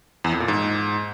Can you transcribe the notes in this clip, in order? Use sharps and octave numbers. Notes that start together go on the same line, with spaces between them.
E2
F2
A#2
G#2